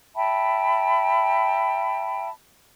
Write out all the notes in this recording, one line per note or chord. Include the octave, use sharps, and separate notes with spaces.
E5 G5 A5 B5